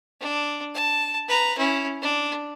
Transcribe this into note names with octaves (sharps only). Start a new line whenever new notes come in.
D4
A5
B4 A#5
C#4 E4
D4